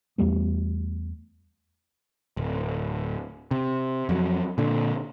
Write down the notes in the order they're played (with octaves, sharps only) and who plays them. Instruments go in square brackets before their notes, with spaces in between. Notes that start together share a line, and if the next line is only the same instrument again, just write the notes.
[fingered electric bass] E2 G3 A3 B3
[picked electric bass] D1
C3
F2 F#3
A#2 D3